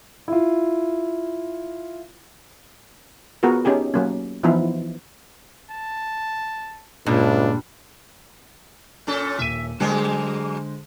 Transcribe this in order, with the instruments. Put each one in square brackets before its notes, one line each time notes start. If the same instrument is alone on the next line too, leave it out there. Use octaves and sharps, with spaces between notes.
[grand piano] E4 F4
[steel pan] B3 F4 F#4 G#4 A#4
C#4 D#4 G4 G#4
F#3 A#3 C#4
E3 F3 B3 D#4 E4
[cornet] A5
[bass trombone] C#2 [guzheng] G2 [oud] A#2 [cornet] D4
[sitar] A#2 C#4 A4
[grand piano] D#1 D#7 [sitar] E5
[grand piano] D3 G#3 C5 [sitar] F#3 A#3 G#4